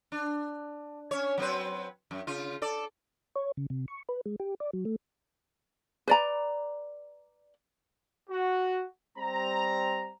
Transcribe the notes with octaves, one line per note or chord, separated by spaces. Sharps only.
D4
C#4 C#5
F#3 C4 B4
F#2
C#3 F4
A4 D5
C#5
C#3
C3
C#6
B4
G#3
G4
D5
F#3
A3
B4 D5 A#5
F#4
G3 C4 A#5